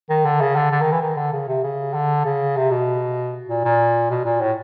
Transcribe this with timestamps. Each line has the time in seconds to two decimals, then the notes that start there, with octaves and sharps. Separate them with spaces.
0.10 D#3
0.25 D3
0.41 C#3
0.56 D3
0.71 D3
0.81 D#3
0.92 E3
1.01 D#3
1.17 D3
1.33 C#3
1.48 C3
1.63 C#3
1.94 D3
2.25 C#3
2.57 C3
2.71 B2
3.49 A#2
3.64 A#2
4.10 B2
4.25 A#2
4.41 A2